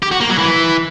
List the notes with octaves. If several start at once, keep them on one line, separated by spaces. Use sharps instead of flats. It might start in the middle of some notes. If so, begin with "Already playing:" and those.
G4
F#4
A#3
F#3
E3